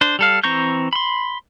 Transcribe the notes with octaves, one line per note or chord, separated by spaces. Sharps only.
D4 C5
G3 A4 F5
E3 C4 A#5 C#6 G6
B5 C6